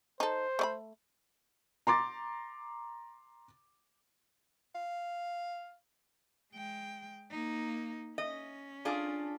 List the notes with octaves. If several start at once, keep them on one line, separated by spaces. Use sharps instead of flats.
D#4 A4 C5
A3 D5 B5
A#5 C6 D6 A6
F5
G#3 G5
A#3 D#4
C#4 D#5
D4 F4 G#4